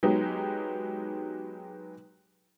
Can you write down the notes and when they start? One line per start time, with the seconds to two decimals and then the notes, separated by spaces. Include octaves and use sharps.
0.03 F#3 G#3 B3 D#4 G4